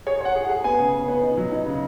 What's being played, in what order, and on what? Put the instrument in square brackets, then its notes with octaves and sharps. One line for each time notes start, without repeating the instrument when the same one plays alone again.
[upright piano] G#4 [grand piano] C#5
[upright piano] C#5 [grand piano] F#5
[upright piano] G#4
[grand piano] F#5
[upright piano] G#4
[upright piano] B3 [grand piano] G#5
[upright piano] C#3
B3
B3
D#4
F#3
D#4
C#3